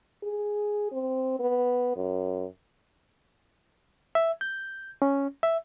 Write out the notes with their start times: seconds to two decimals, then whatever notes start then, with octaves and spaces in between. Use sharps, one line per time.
0.23 G#4
0.92 C4
1.40 B3
1.96 F#2
4.15 E5
4.41 G6
5.02 C#4
5.43 E5